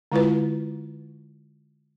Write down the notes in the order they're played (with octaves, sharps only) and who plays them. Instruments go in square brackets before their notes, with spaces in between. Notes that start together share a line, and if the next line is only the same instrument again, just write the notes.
[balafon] D3 G#3 E4 F4 B4